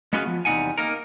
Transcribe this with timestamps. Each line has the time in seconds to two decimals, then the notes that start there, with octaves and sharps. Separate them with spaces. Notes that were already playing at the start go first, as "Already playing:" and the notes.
0.13 G#3 B3 C#4 F4 F#4 G#4
0.26 F3 B3
0.45 E2 C3 G3 D#4 F#5 G#5
0.78 A#3 D#4 A#4